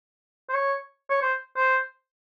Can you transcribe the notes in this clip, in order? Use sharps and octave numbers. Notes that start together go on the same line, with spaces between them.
C5
C#5
C#5
C5
C5